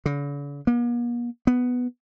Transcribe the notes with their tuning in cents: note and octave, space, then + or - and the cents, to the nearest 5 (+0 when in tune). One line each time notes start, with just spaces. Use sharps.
D3 -45
A#3 +45
B3 +5